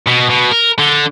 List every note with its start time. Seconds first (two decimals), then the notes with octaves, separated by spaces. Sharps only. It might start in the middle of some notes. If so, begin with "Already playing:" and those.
0.08 B2
0.30 B2
0.52 A#4
0.79 D3